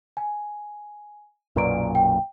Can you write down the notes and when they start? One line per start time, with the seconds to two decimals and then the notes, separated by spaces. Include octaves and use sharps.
0.17 G#5
1.56 B1 F#2 A#2 B4 D5 D7
1.95 G5